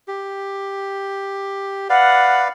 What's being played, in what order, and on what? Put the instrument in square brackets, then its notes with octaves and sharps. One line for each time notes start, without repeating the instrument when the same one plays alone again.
[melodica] G4
[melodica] B4 D5 F5 [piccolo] F#5